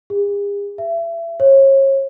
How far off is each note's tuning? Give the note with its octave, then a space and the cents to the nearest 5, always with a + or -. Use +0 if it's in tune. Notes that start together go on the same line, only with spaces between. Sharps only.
G#4 -45
E5 +30
C#5 -35